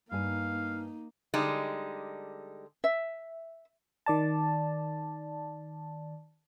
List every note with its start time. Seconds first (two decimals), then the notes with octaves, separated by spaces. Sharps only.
0.12 G2 A#3 D#4 F5 G#5
1.34 D3 G3 G#3 D#4
2.84 E5
4.06 D#3 D5 A5